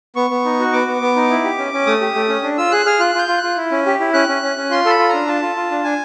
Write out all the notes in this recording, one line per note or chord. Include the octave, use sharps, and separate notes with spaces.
B3 C#6
B3
D#4
F#4
B3 D6
B3
B3
D#4
E4
G4
C#4
C#4
A3 D#6
G4
A3
C#4
D4
F4 E6
G#4 F#6
G#4 F6
F4 F#6
F4 G6
F4
F#6
F4
E4
C#4
G4
E4
C#4 F#6
C#4
C#4
C#4
F4 C6
A4 B5
F4
D4 A#5
F4 A5
F4
F4
D4
D4 G#5